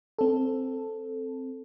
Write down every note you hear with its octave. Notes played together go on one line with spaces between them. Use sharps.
C4 A4